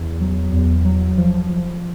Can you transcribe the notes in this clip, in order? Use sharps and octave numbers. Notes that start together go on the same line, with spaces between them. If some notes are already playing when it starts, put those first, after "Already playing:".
Already playing: E2
F#3
E2
F#3
F3
F3